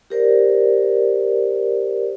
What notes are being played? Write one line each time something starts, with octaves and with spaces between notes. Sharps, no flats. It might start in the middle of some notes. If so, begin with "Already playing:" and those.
G4 A#4 C5 D5